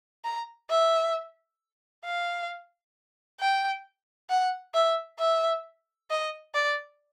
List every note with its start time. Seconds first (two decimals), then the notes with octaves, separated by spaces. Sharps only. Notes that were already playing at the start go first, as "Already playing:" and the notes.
0.24 A#5
0.70 E5
2.05 F5
3.40 G5
4.30 F#5
4.74 E5
5.19 E5
6.10 D#5
6.54 D5